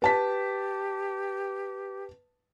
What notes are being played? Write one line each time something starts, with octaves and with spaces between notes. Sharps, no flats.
G4 B4 A5 B6